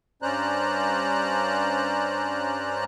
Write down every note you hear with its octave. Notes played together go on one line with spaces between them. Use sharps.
G2 C#4 C5 D5 A#5 F#6